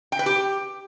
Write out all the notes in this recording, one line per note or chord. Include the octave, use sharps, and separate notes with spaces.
G5
B4
G4